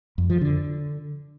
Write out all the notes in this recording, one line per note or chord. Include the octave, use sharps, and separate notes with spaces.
F2
F3
D3